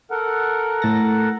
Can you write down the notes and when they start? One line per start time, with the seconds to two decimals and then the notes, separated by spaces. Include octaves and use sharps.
0.11 A4 A#4 F#5
0.82 A2 A6 A#6